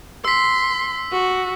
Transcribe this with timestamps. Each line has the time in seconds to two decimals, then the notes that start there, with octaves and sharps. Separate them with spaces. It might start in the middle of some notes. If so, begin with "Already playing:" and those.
0.25 C6 E6 B6
1.12 F#4